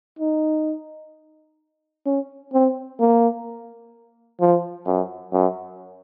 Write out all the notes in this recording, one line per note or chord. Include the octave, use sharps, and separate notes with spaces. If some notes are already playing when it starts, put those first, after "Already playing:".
D#4
C#4
C4
A#3
F3
F#2
F#2